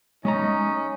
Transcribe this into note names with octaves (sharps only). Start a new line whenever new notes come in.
G#3 A3 C#4 D#4 A#5